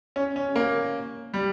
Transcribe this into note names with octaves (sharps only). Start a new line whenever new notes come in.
C#4
C#4
A#3
G3